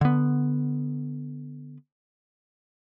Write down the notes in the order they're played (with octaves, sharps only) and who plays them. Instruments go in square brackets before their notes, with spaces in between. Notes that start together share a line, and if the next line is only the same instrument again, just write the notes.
[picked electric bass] D3 B3